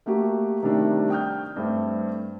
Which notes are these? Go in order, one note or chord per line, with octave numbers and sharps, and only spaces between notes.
A3 A#3 F#4 G4
C3 D#3 G3 A3 D4
G5 D#6 F6 G6
G2 A3 C4